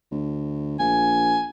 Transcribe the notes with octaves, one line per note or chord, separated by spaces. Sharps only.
D2
A#1 G#5